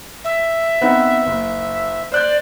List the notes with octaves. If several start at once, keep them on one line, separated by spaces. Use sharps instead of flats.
E5
B3 C4 D#4
F#1
C5 D5 F#6 G6